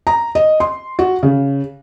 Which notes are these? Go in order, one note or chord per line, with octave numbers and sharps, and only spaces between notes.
A#5
D#5
C6
F#4
C#3